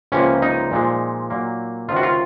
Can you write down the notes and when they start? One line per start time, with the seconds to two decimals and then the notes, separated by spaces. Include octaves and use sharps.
0.12 C#2 C3 F3 A#3 C#4
0.42 D#4
0.71 A#2 F3 G#3
1.30 A#2 F#3 A#3
1.88 C#2 C3 D#3 F4
1.96 F#4
2.03 F4